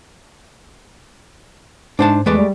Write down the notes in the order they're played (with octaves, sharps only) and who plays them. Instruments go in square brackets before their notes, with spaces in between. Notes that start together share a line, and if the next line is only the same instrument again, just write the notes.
[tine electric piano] G#2 [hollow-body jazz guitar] D4 C5 A5
[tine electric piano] E2 B4 [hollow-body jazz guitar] G#3 A3 D5
[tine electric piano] G3